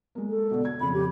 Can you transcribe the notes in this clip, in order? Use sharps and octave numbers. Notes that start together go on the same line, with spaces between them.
G#3 A#3
A4
B2 D3
G#6
F2 C#3 F3 B5
G4